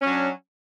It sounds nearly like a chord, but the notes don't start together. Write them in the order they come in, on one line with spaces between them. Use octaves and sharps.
C#4 F#3 D4